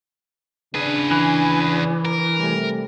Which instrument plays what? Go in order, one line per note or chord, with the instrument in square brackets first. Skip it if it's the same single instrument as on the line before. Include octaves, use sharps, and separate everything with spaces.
[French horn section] C#3 D4 [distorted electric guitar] G#4 B4
[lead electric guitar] E3
[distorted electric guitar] A#4
[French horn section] C3 G3 A3